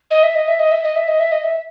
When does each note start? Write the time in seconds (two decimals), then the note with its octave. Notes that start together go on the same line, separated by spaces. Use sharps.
0.11 D#5
0.23 E5
0.35 D#5
0.48 E5
0.59 D#5
0.71 E5
0.83 D#5
0.96 E5
1.08 D#5
1.19 E5
1.32 D#5
1.43 E5